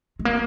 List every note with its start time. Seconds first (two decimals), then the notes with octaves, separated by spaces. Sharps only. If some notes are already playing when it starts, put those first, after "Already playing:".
0.19 G#3
0.25 A#3